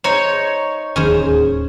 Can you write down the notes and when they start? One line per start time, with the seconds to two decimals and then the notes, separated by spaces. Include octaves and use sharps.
0.04 D#4 C5 C#5
0.96 D1 D#2 D#3 C#4 G#4 C5